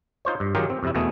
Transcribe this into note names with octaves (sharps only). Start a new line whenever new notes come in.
D#4 F4 C5 C#5
G2
D#3 F#3 F4 G4 G#4 A#4
C4
F2 C3 E4
E2 B2 A3 B3 G#4